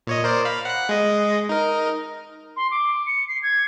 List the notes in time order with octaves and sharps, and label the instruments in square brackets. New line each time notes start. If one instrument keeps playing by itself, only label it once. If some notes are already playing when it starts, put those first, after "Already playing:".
[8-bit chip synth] A#2 C#5 D#5
A#4 C5 D5
F5 B5
F#5 F#6
G#3 D#5
D#4 A#4
[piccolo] C6
D6
C#7
C7
G#6